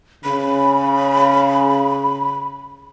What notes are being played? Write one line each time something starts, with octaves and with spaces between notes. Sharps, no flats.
C#3 B5